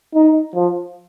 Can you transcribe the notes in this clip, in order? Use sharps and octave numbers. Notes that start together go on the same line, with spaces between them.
D#4
F3